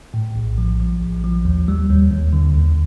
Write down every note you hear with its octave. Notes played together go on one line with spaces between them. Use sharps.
A2
A#1
F3
F3
A#1
F3
D#2
G3
D#2
D#2
D3
D#2